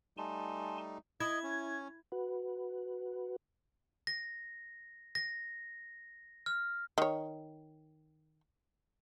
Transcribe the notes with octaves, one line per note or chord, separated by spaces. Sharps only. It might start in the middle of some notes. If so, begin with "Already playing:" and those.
G3 A3 D#4 G#5 A5 C6
E4 D#5 G#6
C#4
F#4 B4
A#6
A#6
F6
D#3 C#5